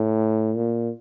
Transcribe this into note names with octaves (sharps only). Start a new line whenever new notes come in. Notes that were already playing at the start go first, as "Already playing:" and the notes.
Already playing: A2
A#2